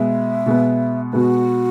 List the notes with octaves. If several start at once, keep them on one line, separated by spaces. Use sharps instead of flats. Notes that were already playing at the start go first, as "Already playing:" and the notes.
Already playing: B2 G#3 B3 E5
B2 G#3 B3
B2 G#3 B3 F#4